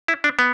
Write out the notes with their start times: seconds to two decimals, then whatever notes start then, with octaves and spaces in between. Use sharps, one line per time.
0.08 E4
0.24 D4
0.39 B3